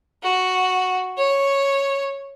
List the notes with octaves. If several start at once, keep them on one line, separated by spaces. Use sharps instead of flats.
F#4
C#5